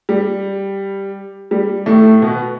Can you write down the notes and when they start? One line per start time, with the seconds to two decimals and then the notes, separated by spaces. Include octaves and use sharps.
0.09 G3
1.51 G3
1.86 A2 A3
2.22 B2 B3